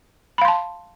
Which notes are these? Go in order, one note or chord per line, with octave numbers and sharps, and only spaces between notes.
F5 A5 B5 C6